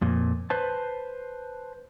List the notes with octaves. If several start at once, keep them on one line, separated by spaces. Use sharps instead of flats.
F2 A#2
B4 C5 A5